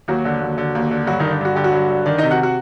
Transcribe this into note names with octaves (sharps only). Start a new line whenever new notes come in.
D#2 F#3 F#4
D3
D#2
D3
D#2
D3
G2 F#3 F#4
D3 D#3 D#4
D4
G2 F#4
D3 G4
F#3 F#4
G2
D3
D#3 D4 D5
C3 D#4 D#5
F#4 F#5
F#4 F#5